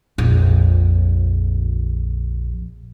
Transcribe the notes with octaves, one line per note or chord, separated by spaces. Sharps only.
A#1 F2